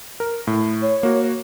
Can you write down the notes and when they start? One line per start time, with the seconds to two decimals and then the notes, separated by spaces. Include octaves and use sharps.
0.20 A#4
0.47 A2
0.82 C#5
1.03 A#3 F#4